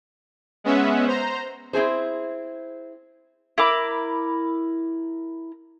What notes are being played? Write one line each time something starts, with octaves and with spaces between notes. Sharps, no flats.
G#3 B3 C#4 E5 F#5
C5 A#5
C4 E4 G#4 C5
E4 A#4 B5 D6